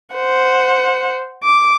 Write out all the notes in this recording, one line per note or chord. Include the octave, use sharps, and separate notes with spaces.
C5 F#5
D6